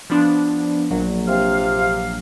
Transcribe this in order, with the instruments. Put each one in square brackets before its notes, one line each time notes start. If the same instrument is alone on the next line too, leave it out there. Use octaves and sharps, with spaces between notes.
[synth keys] F3 B3 D4
A#1 F#3
[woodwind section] C3 F5